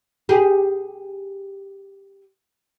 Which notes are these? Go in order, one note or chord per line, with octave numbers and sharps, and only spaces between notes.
G4 G#4